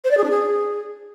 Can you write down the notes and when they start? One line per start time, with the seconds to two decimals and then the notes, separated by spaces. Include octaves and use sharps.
0.04 C5
0.10 D5
0.17 G#4
0.23 D4
0.30 G#4